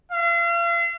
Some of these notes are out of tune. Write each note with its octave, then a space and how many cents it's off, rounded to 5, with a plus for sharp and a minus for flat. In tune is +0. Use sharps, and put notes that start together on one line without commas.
F5 -40